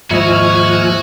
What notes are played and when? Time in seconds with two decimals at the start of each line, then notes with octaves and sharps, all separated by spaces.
0.11 D#2 G#2 F3 E4 F#4 D#5 G#5 F6